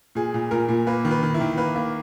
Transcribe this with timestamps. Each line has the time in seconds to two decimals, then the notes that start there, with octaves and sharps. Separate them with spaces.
0.15 A#2 G#4
0.34 A#2
0.51 A#2 A#4
0.68 A#2
0.87 A#3 B4
1.05 D#3
1.11 B4
1.23 D#3
1.34 E4
1.40 D#3
1.57 A#3 B4
1.76 A#3